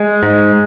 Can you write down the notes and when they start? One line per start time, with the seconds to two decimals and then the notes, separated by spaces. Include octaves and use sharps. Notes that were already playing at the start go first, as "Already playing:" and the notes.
Already playing: G#3
0.23 G#2